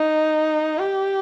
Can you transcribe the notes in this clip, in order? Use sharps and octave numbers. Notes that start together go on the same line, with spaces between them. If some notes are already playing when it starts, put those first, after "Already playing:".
Already playing: D#4
G4